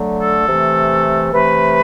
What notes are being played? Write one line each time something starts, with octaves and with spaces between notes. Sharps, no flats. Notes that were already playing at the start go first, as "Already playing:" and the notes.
Already playing: D3 F#3 A3
A4
C3 E3 A3
C3 E3 A3 B4